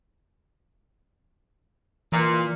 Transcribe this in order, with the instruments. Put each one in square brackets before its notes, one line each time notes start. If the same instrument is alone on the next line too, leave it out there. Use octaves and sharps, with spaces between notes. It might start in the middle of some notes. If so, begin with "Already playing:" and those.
[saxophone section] A#2 [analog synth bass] E3